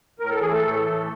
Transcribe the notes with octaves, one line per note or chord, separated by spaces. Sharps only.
A2 A#4
A4
E3 G#4
A3 A4
A2
E3